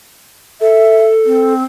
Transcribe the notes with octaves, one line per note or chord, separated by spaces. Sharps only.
A4 E5
C4